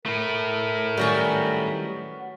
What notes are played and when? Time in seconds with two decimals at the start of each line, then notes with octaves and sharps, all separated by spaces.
0.06 A3 E4 A#4
0.97 D#3 F#3 G3 B3 C#4 F#4